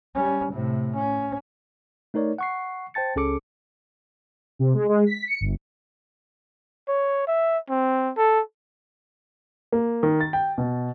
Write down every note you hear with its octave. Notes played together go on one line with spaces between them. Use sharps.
G3 C#4
A2 C3
C#4
A3 D#4 A#4 C#5 D5
F#5 C#6 C7
C5 G5 A5 A6 C#7
C#2 C#4 G#4 A4 D6 C#7
C3
G#3
G#3
B6
C#7
G1
C#5
E5
C4
A4
A#3
D#3
A6
G5
B2